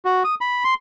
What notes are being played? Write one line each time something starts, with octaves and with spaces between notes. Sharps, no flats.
F#4
D#6
B5
C6